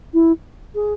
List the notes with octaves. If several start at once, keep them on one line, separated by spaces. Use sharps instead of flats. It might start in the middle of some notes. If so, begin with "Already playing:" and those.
E4
G#4